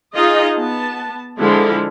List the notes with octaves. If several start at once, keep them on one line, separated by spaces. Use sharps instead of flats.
D#4 F4 G#4 D#5
B3 A5
D3 F3 G#3 E4